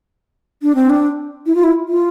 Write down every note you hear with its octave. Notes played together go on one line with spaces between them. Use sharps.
D4
C4
D4
E4
F4
E4
F4